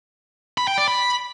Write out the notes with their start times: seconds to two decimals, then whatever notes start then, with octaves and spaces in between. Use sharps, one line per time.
0.58 B5
0.68 G5
0.78 D5
0.88 B5